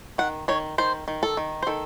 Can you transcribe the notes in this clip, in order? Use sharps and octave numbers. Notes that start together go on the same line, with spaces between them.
D#3 F#5
D#3 C#5
D#3 C5
D#3
A4
D#3
C5
D#3 A4